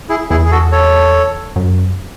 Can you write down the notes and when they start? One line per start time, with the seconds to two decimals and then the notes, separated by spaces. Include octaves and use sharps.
0.09 E4 G#4
0.30 E2 E4 G#4
0.45 G#4
0.51 F#4 A4
0.72 A4 C#5
1.56 F#2